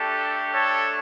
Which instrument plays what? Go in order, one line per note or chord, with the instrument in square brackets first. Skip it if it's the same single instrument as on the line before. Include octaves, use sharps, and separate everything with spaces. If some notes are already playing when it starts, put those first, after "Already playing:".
Already playing: [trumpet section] A3 D4 G4 A4
A4 C#5